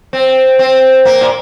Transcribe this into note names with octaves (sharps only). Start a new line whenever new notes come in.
C4
C4
A#3
A#2